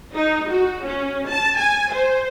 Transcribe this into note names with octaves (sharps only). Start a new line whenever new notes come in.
D#4
F#4
C#4
A5
G#5
C5